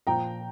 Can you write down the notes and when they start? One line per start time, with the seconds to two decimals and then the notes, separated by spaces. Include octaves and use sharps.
0.07 A#2 F3 G5 A#5